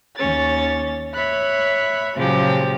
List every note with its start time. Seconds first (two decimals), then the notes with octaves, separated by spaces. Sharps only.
0.16 D#2 C#4 C#5 A6
1.15 C#5 E5 B5 F#6
2.16 A#2 C#3 F3 F#3 G#3 G4